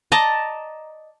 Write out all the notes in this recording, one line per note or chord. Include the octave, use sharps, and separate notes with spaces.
D5 D#5 A5 A#5